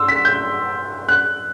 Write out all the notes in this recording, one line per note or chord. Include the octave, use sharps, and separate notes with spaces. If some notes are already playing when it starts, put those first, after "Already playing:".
Already playing: C6 E6
B6
G6
F#6